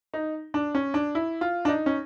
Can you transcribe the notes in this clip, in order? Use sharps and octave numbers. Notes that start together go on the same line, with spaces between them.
D#4
D4
C#4
D4
E4
F4
D4
D#4
C#4